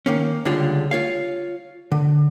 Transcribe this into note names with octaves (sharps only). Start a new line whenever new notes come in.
D#3 A#3 C#4
C#2 D3 G3 G#3 F4
F4 C#5 F5
D3